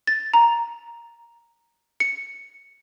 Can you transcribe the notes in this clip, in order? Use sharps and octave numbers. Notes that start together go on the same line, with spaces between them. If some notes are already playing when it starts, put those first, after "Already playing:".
A6
A#5
C#7